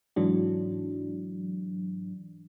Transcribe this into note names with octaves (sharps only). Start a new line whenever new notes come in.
G#2 E3 F#3 D4